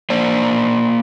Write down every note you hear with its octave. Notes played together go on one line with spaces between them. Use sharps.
A#3 C5 D5